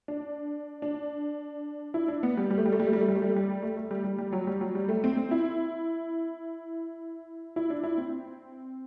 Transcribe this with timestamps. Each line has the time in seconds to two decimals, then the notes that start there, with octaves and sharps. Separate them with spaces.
0.08 D4
0.82 D4
1.94 E4
2.08 D4
2.23 B3
2.37 G3
2.50 G3
2.58 A3
2.66 G3
2.72 A3
2.80 G3
2.87 A3
2.93 G3
3.01 A3
3.08 G3
3.16 A3
3.22 G3
3.29 A3
3.36 G3
3.62 A3
3.77 A3
3.91 G3
4.04 G3
4.18 G3
4.32 F#3
4.47 G3
4.61 F#3
4.75 G3
4.89 A3
5.04 C4
5.17 C4
5.31 E4
7.56 E4
7.70 D4
7.84 E4
7.98 C4